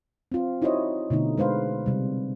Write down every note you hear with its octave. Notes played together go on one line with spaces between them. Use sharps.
C4 F4
D#4 E4 F#4 C5 C#5 D#5
B2 D3 A3 D#4
G#3 B4 C5 F5
C3 G3